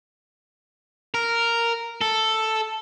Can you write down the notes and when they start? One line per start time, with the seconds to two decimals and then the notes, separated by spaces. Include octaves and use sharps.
1.14 A#4
2.01 A4